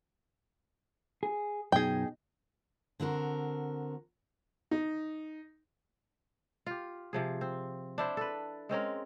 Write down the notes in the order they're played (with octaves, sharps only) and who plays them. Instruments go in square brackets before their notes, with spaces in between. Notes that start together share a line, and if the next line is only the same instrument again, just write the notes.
[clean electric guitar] G#4
[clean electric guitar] F#2 B2 D#4 [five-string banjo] G#4 G5
[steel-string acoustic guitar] D3 C4 F#4 A#4
[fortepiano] D#4
[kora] F4 G4
C3 F3 G#4
C4
D4 E4 C5
A4 B4
G#3 C4 C#4 A#4